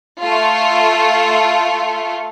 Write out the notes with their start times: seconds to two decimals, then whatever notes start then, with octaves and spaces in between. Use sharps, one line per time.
0.20 A3 F4